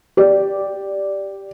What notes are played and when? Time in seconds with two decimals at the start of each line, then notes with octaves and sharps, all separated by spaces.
0.17 G4 D5